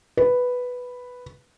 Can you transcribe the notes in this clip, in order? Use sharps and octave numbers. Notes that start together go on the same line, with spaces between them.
B4